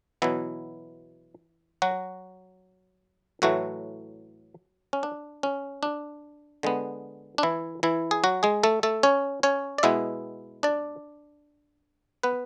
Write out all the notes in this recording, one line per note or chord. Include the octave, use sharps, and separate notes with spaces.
B2 E3 F#3 B3 E4
F#3 F#4
A2 E3 F#3 A3 F#4
C#4
D4
C#4
D4
D3 G#3 B3
D4
E3 E4
E3 E4
G#4
F#3 F#4
G#3 G#4
A3 A4
A3 A4
C#4 C#5
C#4 C#5
D5
B2 G#3 B3 E4 E5
D4 D5
B3 B4